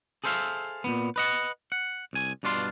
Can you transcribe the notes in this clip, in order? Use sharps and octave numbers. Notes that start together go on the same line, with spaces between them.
G#4 A4 C5 E5 F5
A#2 C#3 B3
B4 D#5 F#5
F#5
C2 G#5
G2 B2 D4 F4 C6